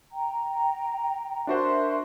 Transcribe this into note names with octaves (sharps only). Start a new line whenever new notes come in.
G5 A#5
D4 F#4 A#4 C5 E5 C6